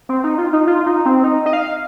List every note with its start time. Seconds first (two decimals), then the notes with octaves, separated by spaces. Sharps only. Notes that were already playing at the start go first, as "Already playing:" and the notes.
0.09 C4
0.24 D#4
0.38 F4
0.53 D#4
0.67 F4
0.86 D#4
1.05 C4
1.23 D#4
1.46 D#5
1.53 F5